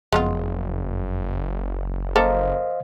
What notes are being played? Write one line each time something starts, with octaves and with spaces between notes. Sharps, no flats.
F#1 F2 G#3 B3 F4
A#3 A4 A#4 C5 D#5 F5